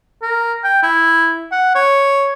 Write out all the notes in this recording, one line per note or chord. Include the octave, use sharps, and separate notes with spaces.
A#4
G5
E4
F#5
C#5